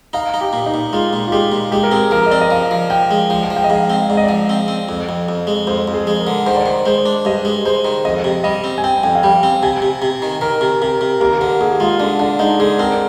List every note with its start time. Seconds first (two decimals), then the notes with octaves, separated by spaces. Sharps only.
0.13 D#4 F5
0.34 D#4
0.41 G4
0.53 A#2
0.66 D#4
0.74 A#2
0.93 G#3 F4
1.13 A#2
1.28 F4
1.32 G#3 G4
1.52 A#2
1.72 G#3 G4
1.83 A#4
1.91 C4 G#4
2.11 F3 A#4
2.26 D#5
2.31 C4 D5
2.41 D#5
2.51 F3 F5
2.71 F3
2.90 F3 G5
3.11 G#3
3.30 F3 G5
3.44 F5
3.50 F3
3.57 G5
3.64 D#5
3.70 G#2 F5
3.90 C4
4.09 G#2 D5
4.17 D#5
4.24 F3 D5
4.49 C4
4.68 C4
4.89 F2
5.09 F2
5.29 F2
5.47 G#3
5.67 F2 C5
5.88 F2
5.94 G#4
6.07 G#3
6.20 A#4
6.27 D3
6.46 D#3 C5
6.56 D5
6.66 D#3 C5
6.86 G#3 C5
7.05 D4
7.25 G2 D#5
7.45 G#3
7.66 G#3 C5
7.85 D#3
8.05 F2 D#5
8.24 C3
8.44 G3 D#5
8.64 C4
8.78 G#5
8.84 C4 G5
9.04 F2 G5
9.15 F5
9.23 G3 G5
9.43 C4
9.63 C3 G#5
9.82 C3
10.02 C3
10.22 D#3
10.41 D#3 A#4
10.61 C3
10.82 C3 A#4
11.01 C3
11.20 D#2 A#4
11.41 D3 A#4
11.61 D#2 G#4
11.80 G#3 F4
12.00 D3 D4
12.19 D3 D4
12.39 G#3 D#4
12.60 D3 G#4
12.79 C4 A#4